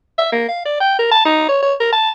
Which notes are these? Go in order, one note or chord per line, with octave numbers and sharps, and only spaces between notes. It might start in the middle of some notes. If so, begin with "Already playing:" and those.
E5
A#3
F5
D5
G5
A#4
A5
D#4
C#5
C#5
A#4
A5